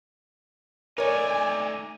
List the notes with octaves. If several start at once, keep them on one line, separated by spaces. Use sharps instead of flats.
A3 D#4 A#4 C#5 D5 G#5